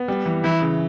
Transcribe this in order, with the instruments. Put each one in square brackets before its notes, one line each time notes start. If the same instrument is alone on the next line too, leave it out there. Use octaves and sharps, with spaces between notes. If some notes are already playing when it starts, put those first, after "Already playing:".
Already playing: [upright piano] B3
G3
E3
[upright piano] E3 [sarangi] E4
[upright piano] C#3